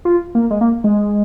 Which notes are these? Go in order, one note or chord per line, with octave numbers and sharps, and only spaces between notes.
F4
A#3
G#3
A#3
G#3